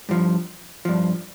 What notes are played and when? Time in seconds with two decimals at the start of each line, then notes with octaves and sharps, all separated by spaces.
0.09 G2 F3
0.85 G2 F3